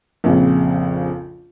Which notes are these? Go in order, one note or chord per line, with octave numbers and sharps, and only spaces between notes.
A#1 F2 C#3